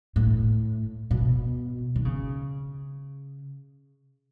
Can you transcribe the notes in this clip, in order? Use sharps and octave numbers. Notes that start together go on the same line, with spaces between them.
A2
B2
D#3
C#3